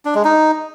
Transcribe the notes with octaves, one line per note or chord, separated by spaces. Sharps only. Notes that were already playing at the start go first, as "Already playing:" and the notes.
D4
G#3
D#4